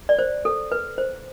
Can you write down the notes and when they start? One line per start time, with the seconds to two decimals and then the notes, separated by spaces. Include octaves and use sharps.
0.09 D5
0.19 C5
0.45 A4
0.72 B4
0.98 C5